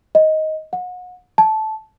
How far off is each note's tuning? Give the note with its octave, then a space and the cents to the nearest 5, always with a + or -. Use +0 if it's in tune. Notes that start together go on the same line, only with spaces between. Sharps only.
D#5 +10
F#5 -35
A5 -15